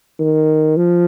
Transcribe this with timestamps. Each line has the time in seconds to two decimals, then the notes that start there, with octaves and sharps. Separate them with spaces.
0.19 D#3
0.77 F3